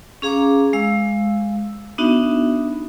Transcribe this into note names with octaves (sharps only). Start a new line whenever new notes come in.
C#4 G#4 F5 A#5 D6
G#3 F5 E6
B3 D4 D#4 F#4 E5